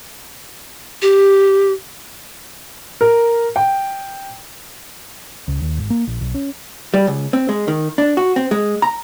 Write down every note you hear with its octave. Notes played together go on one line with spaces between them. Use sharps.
G4
A#4
G5
C#2
D#2
G#1
A#3
A#1
B1
C#4
G3
C#2
C4
G#3
D#3
D4
F#4
C4
G#3
A#5